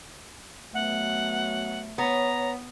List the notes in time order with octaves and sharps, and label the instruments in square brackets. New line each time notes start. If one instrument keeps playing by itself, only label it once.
[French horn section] F#3 B3 [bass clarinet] A3 [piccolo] F#5
[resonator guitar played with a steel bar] B3 [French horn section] C#5 [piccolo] A#5